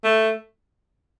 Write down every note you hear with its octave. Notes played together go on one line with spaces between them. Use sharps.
A3